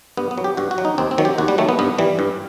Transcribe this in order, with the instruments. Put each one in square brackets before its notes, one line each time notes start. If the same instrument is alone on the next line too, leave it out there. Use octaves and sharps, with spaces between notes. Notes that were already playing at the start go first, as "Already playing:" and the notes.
[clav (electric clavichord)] G2 B3
B3
F#3
G4
G2 F#4
F#4
F#3
D#4
D#2 C4
C4
D#3 F#3
G4
D#2 F#4
G3
D#3 F#3 A3
B3
G2 B3
E3 G3
G2